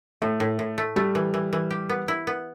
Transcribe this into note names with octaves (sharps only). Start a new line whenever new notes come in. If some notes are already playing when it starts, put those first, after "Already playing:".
A2 A3
A2
A2
A3
G3 A3
E3
E3
E3
G4
B3
E4
B3